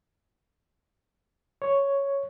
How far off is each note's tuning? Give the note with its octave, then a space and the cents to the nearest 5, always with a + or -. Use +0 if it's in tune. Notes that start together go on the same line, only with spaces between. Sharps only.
C#5 +0